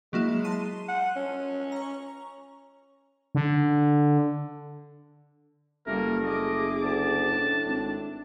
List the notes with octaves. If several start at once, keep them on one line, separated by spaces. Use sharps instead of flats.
F#3 G#3 A#3 E4
A5 C6 D#7
F#5
C#4
A#5 C#6
D3
F#1 G3 A3 A#3 A#4
G#4 D#5 D6
D2 A5
A2 D4
G#1